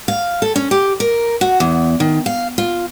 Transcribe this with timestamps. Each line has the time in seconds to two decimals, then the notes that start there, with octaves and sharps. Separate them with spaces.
0.08 F5
0.42 A4
0.56 C#4
0.71 G4
1.00 A#4
1.41 F#4
1.60 E2
2.00 D#3
2.26 F5
2.58 F4